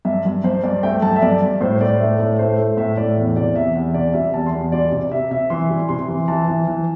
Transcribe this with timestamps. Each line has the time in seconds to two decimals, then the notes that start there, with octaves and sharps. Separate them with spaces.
0.05 G2 E5
0.25 G2
0.44 G2 C5
0.64 G2 D5
0.83 A3 G5
1.02 G2 A5
1.16 E5
1.22 G2 D5
1.41 G2
1.61 A2 C5
1.81 A2 D5
2.00 A3
2.20 A2
2.39 A3 C5
2.59 A3
2.77 A2 E5
2.97 A2 D5
3.17 E2
3.36 C3 D5
3.55 E2 E5
3.75 E2
3.94 C3 D5
4.14 G3 E5
4.33 E2 A5
4.46 C6
4.53 E2
4.72 G3 D5
4.92 C3 D5
5.12 C3 E5
5.30 C3 E5
5.50 E3 C6
5.70 G3
5.89 C3 C6
6.08 E3
6.28 E3 A5
6.47 E3
6.67 E3